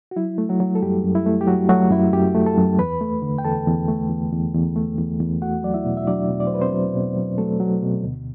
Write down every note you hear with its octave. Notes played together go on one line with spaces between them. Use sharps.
F#4
F#3 E4
A3
F#3 F#4
F#3
A4
F#2 G3 G4
F#2
E4
A3
G4
F#3 F#4
F#3 A3 F#4
F#2 E4 E5
F#2 G4 G5
A3
A4 A5
F#2
E2 B4 B5
A3
D3
G5
E2 A4 A5
E2
A3
E2
E2
E2
A3
E2
E2
A3 F#4 F#5
F#3 D5
E4 E5
B2
E5
F#3 D4 D5
B2
D5
C5
F#3 B4
C4 C5
F#3
B2
F#3
F#3 A3 A4
F#3
B2
D2